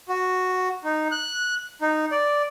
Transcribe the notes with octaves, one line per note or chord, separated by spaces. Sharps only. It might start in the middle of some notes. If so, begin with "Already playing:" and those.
F#4
D#4
F#6
D#4
D5